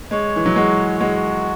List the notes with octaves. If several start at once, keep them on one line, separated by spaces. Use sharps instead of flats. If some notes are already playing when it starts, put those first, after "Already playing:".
G#3 C#5
E3
F#3
G#3 F#4
G#3 F#4